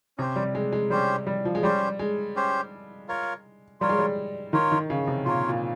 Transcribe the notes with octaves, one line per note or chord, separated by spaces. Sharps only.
C3 C#4 G4 C5
G3
G#3
G#3
G3 C#4 G4 C5
G3
F3
G#3
G3 C#4 G4 C5
G#3
C#4 G4 C5
F4 A#4 C#5
G3 F4 A#4 C#5
G#3
G3
D#3 F4 A#4 C#5
D#3
C#3
C3
A#2 F4 A#4 C#5
A#2